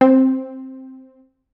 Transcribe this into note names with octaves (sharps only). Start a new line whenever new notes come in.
C4